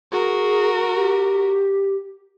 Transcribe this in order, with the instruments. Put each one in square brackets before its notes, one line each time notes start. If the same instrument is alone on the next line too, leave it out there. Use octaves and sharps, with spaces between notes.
[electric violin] F#4 A#4 [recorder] G#4
[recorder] G4